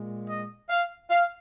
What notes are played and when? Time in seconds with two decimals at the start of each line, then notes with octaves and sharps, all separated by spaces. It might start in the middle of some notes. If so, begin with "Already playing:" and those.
Already playing: A#2 G#3
0.28 D#5
0.69 F5
1.10 F5